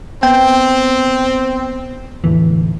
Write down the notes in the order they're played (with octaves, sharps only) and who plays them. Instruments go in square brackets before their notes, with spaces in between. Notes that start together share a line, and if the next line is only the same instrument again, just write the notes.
[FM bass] B3 [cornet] C4 [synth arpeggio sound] G5
[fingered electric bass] E2 A2 D3 [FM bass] E3